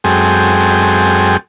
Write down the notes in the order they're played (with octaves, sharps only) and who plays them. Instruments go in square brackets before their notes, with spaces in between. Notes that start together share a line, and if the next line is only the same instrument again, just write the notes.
[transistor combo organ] F#2 G#3 C4 G#4 A4 G5